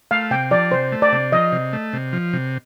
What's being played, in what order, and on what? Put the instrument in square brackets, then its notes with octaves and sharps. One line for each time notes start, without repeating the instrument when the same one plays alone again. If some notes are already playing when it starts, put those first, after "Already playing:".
[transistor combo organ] A3 [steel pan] F5
[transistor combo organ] C3 [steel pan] G5
[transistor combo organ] F3 [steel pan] D5
[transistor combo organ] C3 [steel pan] C5
[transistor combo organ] A3
[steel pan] D5
[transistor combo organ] C3
[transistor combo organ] F3 [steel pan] D#5
[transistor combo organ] C3
A3
C3
F3
C3